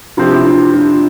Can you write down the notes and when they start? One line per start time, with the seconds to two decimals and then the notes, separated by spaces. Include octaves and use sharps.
0.17 C3 F3 C4 D4 F4 G4
0.34 E4
0.46 D4 F4
0.73 D4 F4